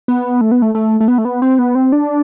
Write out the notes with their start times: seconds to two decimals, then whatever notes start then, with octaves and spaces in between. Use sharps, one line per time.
0.08 B3
0.41 A3
0.51 B3
0.62 A3
0.75 A3
1.00 A3
1.08 B3
1.18 A3
1.25 B3
1.42 C4
1.59 B3
1.75 C4
1.92 D4